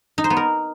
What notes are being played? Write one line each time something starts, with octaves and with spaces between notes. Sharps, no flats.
D#4
C5
B3
A#4